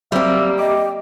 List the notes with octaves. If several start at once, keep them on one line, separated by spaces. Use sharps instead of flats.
F#3 G3 A#3 C4 E5
G4 D#5 D6